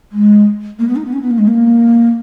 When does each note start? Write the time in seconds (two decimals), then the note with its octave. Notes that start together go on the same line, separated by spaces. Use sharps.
0.11 G#3
0.79 A#3
0.87 B3
0.96 D#4
1.05 B3
1.13 C#4
1.22 B3
1.30 A#3
1.38 G#3
1.47 A#3